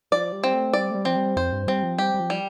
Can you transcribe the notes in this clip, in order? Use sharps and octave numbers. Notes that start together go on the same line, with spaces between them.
F3 D5
G3
C4
A3
G3 D5
A3
G3
F3 C4
G3
F2 C5
G2
G3 C4
F3
G3 G4
G3
F3
G3